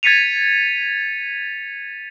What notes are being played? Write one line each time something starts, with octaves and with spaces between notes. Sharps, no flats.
G#6 A6 B6 C#7 D#7 F7